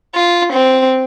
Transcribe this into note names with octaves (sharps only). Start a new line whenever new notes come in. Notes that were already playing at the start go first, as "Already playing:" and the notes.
F4
C4